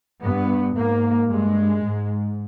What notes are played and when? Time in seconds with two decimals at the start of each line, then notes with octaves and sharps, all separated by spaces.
0.22 G2 B3
0.75 G#2 A#3
1.29 G2 G#3
1.83 G#2